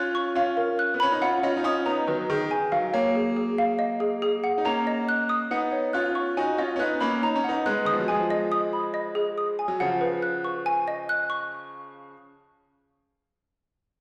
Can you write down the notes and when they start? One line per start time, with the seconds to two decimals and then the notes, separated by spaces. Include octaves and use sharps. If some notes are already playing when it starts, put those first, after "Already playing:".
Already playing: C#4 F4 F#6
0.15 C#6
0.35 C#4 F4 F5
0.57 A#4
0.79 F#6
0.94 B3
1.00 C#4 B5
1.12 D#4
1.21 C#4 F4 F#5
1.43 C#4 F4 D#5
1.57 D#4
1.64 C#4 F4 D#6
1.86 B3 D#4 A#5
2.07 D#3 F#3 B4
2.30 D#3 G#4
2.51 G#5
2.72 D#3 F#3 F5
2.93 F#3 A#3 C#5
3.15 G#4
3.37 G#4
3.58 F5
3.79 D#5
4.00 G#4
4.22 G#4
4.44 F#5
4.58 D#4
4.65 A#3 C#4 A#5
4.87 D#5
5.09 F#6
5.29 D#6
5.51 B3 D#4 F#5
5.72 C#5
5.93 C#4 F4 F#6
6.15 C#6
6.37 D#4 F#4 G#5
6.58 C#4 F4 D#5
6.76 C#4
6.79 B3 D#4 F#6
7.01 A#3 C#4 B5
7.23 D#4 A#5
7.35 C#4
7.44 B3 D#4 F#5
7.66 G#3 B3 F#6
7.85 D#3 D#6
7.93 F3
8.00 F#3
8.08 F3 G#3 G#5
8.30 D#5
8.52 D#6
8.73 B5
8.94 D#5
9.15 G#4
9.38 D#6
9.59 G#5
9.68 F#3
9.80 C#3 F3 F#5
10.01 B4
10.22 F#6
10.44 C#6
10.66 G#5
10.88 D#5
11.09 F#6
11.30 C#6